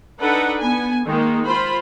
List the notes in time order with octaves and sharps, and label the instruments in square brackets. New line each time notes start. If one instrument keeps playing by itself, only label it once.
[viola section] D4 D#4 A4 B4 F#5
B3 G#5
D#3 G#3 A#3 D#4
F4 C5 B5